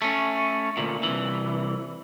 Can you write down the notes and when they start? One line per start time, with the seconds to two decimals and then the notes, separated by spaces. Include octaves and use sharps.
0.02 A3 C#4
0.77 D2 A#2
1.03 C2 E3